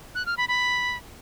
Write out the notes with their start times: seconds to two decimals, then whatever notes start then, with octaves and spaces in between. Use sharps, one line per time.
0.15 F#6
0.26 F6
0.37 B5
0.48 B5